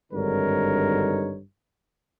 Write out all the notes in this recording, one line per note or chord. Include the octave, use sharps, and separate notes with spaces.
G#1 G2 D3 D#4 A#4 C#5